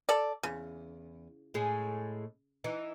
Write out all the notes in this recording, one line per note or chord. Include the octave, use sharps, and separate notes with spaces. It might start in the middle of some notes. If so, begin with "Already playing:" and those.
A4 D5
E2 C#3
A2 G#3 G#4
E3 D#4